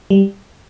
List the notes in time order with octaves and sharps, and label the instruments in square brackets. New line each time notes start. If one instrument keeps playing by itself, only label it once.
[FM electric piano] G3